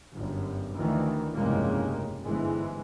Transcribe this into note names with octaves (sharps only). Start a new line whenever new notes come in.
G1 F#2
D2 D#3 E3
F1 C2 G2 C#3 G#3 A#3
G1 G#2 E3 G#3